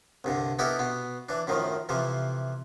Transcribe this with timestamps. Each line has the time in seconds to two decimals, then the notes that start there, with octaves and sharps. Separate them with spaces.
0.24 C2 G2 D3
0.59 B3 D#4 E4 G4 A4 A#4
0.79 B2 B3
1.29 E3 D4
1.47 F#2 A2 D#3 F3
1.89 F2 C3 E3 F3